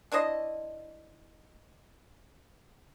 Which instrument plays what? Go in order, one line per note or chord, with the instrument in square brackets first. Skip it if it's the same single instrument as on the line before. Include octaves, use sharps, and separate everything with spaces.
[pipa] D4 E4 C5 D#5